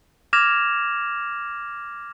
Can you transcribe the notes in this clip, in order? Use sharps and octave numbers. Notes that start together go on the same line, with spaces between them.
D6 F6 G#6 A#6 E7 F7